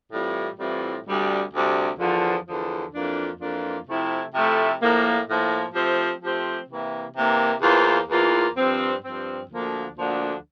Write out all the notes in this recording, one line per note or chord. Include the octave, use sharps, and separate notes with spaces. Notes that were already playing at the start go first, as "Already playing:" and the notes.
A2 E3 G3 C4 F4
A2 E3 G3 C4 F4
D2 C3 G3
D2 C3 G3
E2 D3 F3
E2 D3 F3
F2 E3 A#3 D4 F4
F2 E3 A#3 D4 F4
C3 F3 A3 E4
C3 F3 A3 E4
A2 F3 A#3
A2 F3 A#3
F3 A3 C4 G4 C5
F3 A3 C4 G4 C5
C3 E3 A#3
C3 E3 A#3
E2 E3 A#3 F4 C5
E2 E3 A#3 F4 C5
G2 F3 C4
G2 F3 C4
D2 D3 F3 A#3 D4
D2 D3 F3 A#3 D4